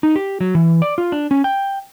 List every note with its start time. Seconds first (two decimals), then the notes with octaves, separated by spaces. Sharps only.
0.03 D#4
0.16 G4
0.41 F#3
0.55 E3
0.82 D5
0.98 F4
1.12 D4
1.31 C#4
1.44 G5